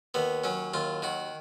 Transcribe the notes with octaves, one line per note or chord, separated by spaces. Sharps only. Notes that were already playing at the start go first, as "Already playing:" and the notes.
D#2 B3
F#3 C#4
D#2 F4
D#3 F#4